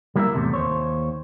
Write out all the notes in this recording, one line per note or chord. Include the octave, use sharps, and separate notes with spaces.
G3 A#3 E4 A#4 D#5 E5
E2 A2 C3 A3
D#2 C5 C#5